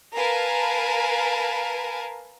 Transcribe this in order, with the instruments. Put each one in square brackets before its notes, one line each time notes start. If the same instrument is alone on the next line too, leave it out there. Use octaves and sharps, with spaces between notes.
[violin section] A#4 B4 F5 G#5 A5